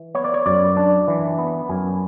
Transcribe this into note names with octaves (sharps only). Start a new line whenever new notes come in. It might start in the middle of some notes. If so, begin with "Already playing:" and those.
Already playing: E3
B3 C#5
D5
C#5
F#2 D5
D4
E3
B3
F#2 G#5